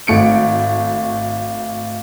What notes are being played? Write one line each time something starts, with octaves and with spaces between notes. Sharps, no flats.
G#1 A3 C#7 D7